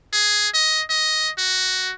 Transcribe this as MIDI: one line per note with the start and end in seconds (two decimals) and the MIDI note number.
0.13 0.48 68
0.54 0.83 75
0.89 1.31 75
1.38 1.93 66